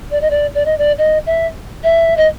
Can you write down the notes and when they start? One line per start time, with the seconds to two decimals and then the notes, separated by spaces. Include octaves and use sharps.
0.11 D5
0.21 D#5
0.30 D5
0.55 D5
0.65 D#5
0.78 D5
0.98 D#5
1.26 E5
1.84 E5
2.17 D#5